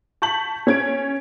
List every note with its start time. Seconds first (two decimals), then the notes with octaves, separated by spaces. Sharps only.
0.22 A5 C#6 G6 B6 F#7
0.67 C#4 G#6 D7